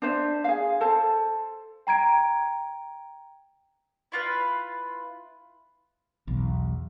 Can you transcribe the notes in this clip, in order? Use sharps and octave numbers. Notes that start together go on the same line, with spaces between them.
D4 C5 E5
G#4 F5
A4 C5 A5
G5 A#5 G#6 D7
E4 F4 B4
B1 E2